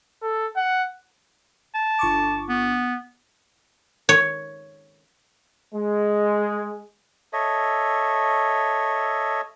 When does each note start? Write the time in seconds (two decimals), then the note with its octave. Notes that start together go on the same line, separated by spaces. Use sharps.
0.22 A4
0.56 F#5
1.75 A5
1.99 G1 C#6 D6
2.49 B3
4.09 C#5
5.73 G#3
7.33 A4 C#5 D#5 E5